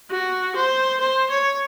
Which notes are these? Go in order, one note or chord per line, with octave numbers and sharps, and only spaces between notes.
F#4
C5
C5
C#5